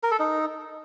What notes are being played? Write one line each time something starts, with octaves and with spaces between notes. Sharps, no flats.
A#4
A4
D#4